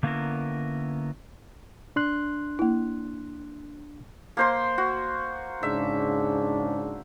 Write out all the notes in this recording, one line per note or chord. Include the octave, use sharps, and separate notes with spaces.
D3 A#3 B3 C#4 E4 A#4
D4 C6 F#6
A#3 E4
A#3 C5 C6
F#4
G#2 C#3 D4 E5